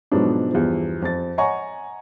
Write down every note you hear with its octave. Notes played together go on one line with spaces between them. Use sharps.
G#2 B2 F3 F#3 B3 D4
E2 G2 F3
F2 A6
C#5 D#5 F#5 G#5 A#5 C#6